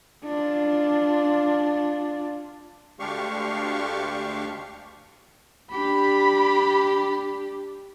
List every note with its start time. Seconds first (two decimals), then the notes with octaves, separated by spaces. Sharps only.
0.25 D4 F4
2.99 D2 G#3 D4 G4 F5 C#6
5.72 D4 G4 B5